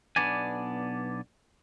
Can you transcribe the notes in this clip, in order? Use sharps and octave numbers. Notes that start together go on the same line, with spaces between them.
B1 B3 D4 D5 G#5